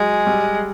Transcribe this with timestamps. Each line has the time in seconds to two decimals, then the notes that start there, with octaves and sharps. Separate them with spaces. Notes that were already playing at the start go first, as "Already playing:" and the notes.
Already playing: F#3 G#3
0.27 G3